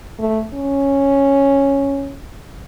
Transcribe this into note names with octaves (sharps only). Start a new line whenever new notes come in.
A3
C#4